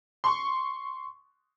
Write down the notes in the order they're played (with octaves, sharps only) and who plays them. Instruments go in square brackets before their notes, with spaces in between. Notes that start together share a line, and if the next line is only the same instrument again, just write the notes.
[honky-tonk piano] C6 C#6